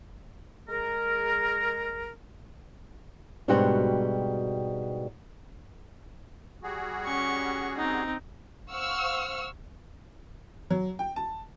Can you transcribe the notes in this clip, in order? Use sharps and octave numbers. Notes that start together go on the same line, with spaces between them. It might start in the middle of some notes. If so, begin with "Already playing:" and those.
G#3 G#4 A#4
G#2 B2 G3 C4 D4 F#4
G3 F#4 G#4
C#4 C#6
C4 D#4
C5 F5 F#5 C#6 E6 F6
F#3
G5
A5